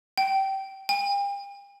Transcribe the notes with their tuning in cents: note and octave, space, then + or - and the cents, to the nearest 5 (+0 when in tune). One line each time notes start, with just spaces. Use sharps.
G5 -20
G5 +40